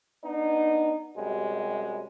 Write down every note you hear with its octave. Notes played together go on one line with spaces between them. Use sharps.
B3 D4 D#4
F#2 C3 G3 G#3